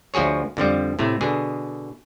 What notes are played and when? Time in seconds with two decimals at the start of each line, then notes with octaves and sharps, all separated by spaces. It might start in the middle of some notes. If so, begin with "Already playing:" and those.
0.14 D2 F3 F#4 G#4 C#5
0.57 F2 D3 F3 G3
0.99 A2 C3 A3
1.21 B2 D3 G#4